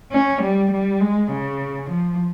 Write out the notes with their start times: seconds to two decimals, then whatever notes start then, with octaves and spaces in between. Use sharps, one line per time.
0.12 C#4
0.43 G3
0.72 G3
1.01 G#3
1.32 C#3
1.90 F3